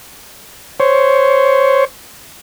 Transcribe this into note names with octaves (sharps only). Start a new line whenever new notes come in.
C5 C#5